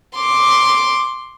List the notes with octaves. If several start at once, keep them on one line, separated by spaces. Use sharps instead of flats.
C6 D6